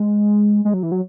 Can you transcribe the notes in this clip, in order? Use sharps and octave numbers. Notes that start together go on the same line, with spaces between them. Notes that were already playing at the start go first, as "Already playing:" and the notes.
Already playing: G#3
G#3
F#3
E3
F#3